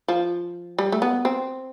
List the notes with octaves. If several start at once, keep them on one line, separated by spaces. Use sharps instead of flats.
F3
G3
A3
B3
C4